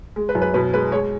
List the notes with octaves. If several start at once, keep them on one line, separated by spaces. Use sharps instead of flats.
G#3
B4
F#2
B4
B2 B4
G#3 B4
G#3 C#5